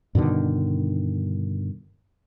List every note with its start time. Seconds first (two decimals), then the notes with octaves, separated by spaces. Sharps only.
0.15 G2 B2 D3 D#3